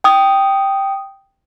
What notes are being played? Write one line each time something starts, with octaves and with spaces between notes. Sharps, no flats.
G5 D#6